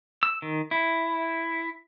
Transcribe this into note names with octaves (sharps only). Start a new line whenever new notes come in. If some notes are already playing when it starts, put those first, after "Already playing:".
E6
D#3
E4